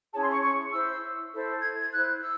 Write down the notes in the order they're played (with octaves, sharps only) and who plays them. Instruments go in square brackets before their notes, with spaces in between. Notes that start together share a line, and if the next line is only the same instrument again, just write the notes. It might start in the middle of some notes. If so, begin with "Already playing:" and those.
[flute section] C#4 E4 G#4 C#5 A5
C6
C#6
C#6
E4 C5 E6
E4 A4 C5
G#6
G#6
E4 C5 F#6
E6